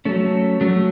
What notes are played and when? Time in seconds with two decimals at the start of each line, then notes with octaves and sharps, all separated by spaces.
0.05 F#3 A3 C#4
0.61 F#3 A3 C#4